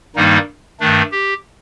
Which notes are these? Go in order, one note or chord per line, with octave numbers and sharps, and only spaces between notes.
G2 D#3 G3 A#3 D#4
G2 D#3 A3 D4
G4